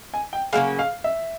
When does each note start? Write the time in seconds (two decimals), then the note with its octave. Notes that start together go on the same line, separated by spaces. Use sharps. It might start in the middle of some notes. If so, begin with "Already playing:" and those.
0.14 G#5
0.33 G5
0.53 C#3 F#3 A#3 C#4 F5
0.79 F5
1.04 E5